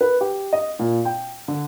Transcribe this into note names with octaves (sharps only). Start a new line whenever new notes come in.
B4
G4
D#5
A#2
G5
D3